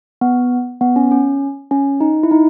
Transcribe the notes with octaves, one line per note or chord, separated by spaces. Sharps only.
B3
B3
C#4
C#4
C#4
D#4
E4
D#4